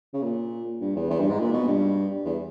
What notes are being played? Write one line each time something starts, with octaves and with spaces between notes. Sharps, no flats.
C#3
A#2
G2
E2
E2
G2
G#2
A#2
B2
G2
E2